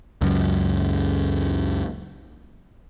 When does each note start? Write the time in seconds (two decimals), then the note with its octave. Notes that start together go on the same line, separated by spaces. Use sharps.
0.21 C#2 F#2